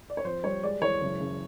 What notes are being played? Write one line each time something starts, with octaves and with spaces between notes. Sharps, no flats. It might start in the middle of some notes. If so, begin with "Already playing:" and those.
D5
C#5
F2 C5
G3 C#5
G#3 D5
E3 C#5
F#1
C#3